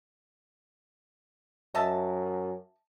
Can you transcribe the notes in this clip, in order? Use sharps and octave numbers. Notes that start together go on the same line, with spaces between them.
F#2 D#5 E5 A5